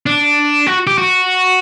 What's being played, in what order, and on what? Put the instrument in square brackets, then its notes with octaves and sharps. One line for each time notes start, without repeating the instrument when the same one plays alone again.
[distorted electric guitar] D4
F#4
G4
F#4